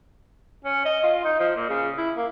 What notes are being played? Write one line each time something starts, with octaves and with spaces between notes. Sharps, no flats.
C#4
D#5
F4
D#4
F3
A#2
C#3
E4
A#3